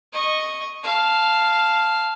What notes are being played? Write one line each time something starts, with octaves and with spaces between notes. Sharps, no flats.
D#5 C#6
F5 A5